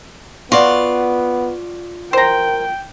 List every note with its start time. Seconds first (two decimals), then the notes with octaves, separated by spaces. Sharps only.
0.52 B3 F4 F#4 D5
2.13 A#4 C5 G5 A#5